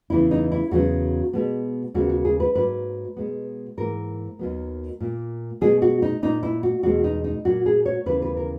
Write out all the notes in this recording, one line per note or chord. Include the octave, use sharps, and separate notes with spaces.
E2 C#3 E3 B3 E4
D#4
E4
E2 C#3 F#3 B3 F#4
B2 G#3 B3
D#2 C#3 G#3 B3 F#4
F#4
G#4
B4
G#2 F#3 A#3 B4
B2 G#3 B3
G#2 E3 A#3 A#4
D#2 D#3 F#3 B3
A#2 A#3
B2 G#3 B3 G#4
F#4
D#4
A#2 A#3 D#4
E4
F#4
E2 B2 G#3 B3 F#4
D#4
D#4
A#2 F#3 A#3 F#4
G#4
C#5
D#2 C#3 E3 B3 B4
B4
A#4